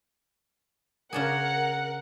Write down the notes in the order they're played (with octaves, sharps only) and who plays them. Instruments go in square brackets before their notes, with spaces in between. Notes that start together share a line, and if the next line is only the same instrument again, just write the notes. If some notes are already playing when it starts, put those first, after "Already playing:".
[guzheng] C#3 D4 G#4 [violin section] A#4 F#5